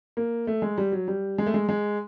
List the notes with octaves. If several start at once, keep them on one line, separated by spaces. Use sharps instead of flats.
A#3
A3
G#3
G3
F#3
G3
G#3
A3
G#3
G#3